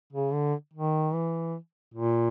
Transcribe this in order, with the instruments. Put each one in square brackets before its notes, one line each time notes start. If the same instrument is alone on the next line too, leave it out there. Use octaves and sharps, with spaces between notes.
[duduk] C#3
D3
D#3
E3
A#2